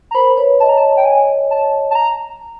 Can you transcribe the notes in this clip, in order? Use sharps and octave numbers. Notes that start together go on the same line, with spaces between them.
A#5
A#4 C5 B5
B4 C#5
C#5 D#5 A5
A#5
A5
G5
G#5
A5
A5
A#5